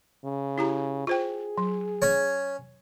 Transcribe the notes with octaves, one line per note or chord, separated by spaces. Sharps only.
C#3
E4 G4 A#5
F4 G#4 C5 G5
F#3
C#4 C#5